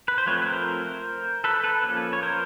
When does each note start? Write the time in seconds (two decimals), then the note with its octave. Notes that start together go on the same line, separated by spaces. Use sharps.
0.08 B4
0.18 C5
0.26 F3 A3 C4 B4 C#5
0.42 B4
0.46 A#4 C5
1.44 A4 B4
1.64 A4 B4
1.84 F3 A#3 C#4
2.13 C#5
2.23 A#4 C5